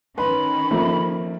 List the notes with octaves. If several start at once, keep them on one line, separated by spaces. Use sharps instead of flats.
D#3 C#4 B4 B5 C6
F3 A3 A#3